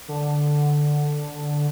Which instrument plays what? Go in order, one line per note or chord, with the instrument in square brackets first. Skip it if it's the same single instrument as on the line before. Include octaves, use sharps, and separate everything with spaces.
[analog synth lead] D3